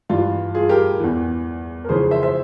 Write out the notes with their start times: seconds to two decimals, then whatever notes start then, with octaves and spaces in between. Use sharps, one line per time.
0.09 G2 E3 F4
0.55 F4 G#4
0.69 G4 A#4
0.99 E2 E3
1.85 A#4
1.89 F2 C#3 E3 G#4 C5
2.11 C5 E5
2.22 C5 E5